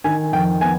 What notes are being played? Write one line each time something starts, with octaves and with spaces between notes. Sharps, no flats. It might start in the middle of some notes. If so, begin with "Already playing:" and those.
D#3 G#5
F2 G5
B3 G#5